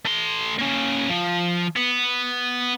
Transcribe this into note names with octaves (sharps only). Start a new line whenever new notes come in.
A3 C6
A#3 C#4
F3
B3